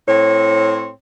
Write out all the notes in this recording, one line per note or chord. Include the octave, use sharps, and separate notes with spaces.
A2 C4 C#5